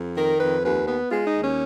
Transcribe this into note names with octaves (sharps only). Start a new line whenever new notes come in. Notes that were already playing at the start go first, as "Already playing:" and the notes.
Already playing: F2
D#3 A#4
F2 B4
D#2 B4
B3 B4
G#3 F4
D#4
D#2
C#4